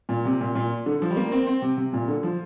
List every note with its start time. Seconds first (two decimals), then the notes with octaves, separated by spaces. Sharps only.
0.09 A#2
0.25 C3
0.41 A#2
0.55 A#2
0.86 D3
1.02 F3
1.11 G3
1.17 A#3
1.32 C4
1.47 C4
1.62 C3
1.78 C3
1.93 A#2
2.08 D3
2.23 F3